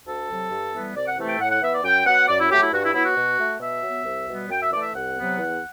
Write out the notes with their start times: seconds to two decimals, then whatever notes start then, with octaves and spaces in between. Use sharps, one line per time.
0.06 D2 A4
0.28 C3 F#3
0.51 G2
0.73 E3 G3 B3
0.95 C2 D5
1.06 F#5
1.17 C3 E3 A3
1.28 G5
1.38 A2 F#5
1.50 F#5
1.61 E3 B3 E5
1.72 D5
1.83 F#2 G5
2.06 F#3 B3 F#5
2.27 F#2 D5
2.38 E4
2.50 F#3 A3 G4
2.61 E4
2.72 G2 F#4
2.83 E4
2.94 F#3 B3 E4
3.05 F#4
3.16 B2
3.39 A3
3.60 B2 E5
3.83 F#3 B3
4.05 C2
4.27 B2 G3 B3
4.49 F#2 G5
4.60 E5
4.71 E3 A3 D5
4.82 E5
4.93 C2 F#5
5.16 C3 F#3 B3
5.38 E2